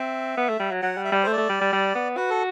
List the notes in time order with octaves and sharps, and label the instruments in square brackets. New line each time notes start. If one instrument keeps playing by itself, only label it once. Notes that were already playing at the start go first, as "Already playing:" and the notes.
Already playing: [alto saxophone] C4 [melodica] E5
[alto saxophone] B3
A3
G3
F#3
[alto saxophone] F#3 [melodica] F#5
[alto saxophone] G3
[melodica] E5
[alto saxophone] G3 [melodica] D5
[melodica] C5
[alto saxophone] A3
[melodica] D5
[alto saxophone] A3
G3
G3
G3
B3
[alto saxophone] F#4 [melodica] B4
[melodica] A4